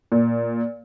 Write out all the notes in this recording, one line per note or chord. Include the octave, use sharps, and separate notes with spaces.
A#2